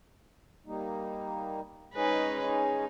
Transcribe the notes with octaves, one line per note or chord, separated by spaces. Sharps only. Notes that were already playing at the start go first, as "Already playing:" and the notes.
G3 A#3 D#4
G#3 C#4 D#4 G#4 B4
D#4